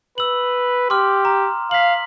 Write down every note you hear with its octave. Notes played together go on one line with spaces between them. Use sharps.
B4 E6 F#7
G4 C6 D6 F6
A#5
F5 B6 F#7